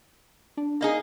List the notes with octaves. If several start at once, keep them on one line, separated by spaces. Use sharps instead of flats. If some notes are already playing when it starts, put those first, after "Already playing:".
D4
A#3 D#4 G#4